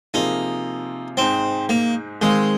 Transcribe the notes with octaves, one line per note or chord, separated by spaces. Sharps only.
C3 F3 A#3 D#4 F4 G#4
G#2 G#3 C4 D#4 C5
A#3
D#3 G#3 C4 G#4 F5